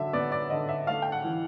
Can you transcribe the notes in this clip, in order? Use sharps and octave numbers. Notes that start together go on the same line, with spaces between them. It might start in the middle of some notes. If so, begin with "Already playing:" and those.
Already playing: D3 F#3 E5
B3 D5
D5
D3 D#5
E5
A3 F5
G5
F#5
E3